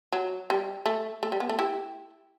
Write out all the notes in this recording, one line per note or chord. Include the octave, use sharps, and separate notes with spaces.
F#3
G3
A3
A3
G3
B3
A3
E4 G4